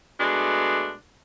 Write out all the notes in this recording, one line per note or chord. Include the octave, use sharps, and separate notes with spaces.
B2 G#3 A3 D4